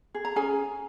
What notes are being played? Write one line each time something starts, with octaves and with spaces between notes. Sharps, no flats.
G#4
A#5
C#4 G#4 G#5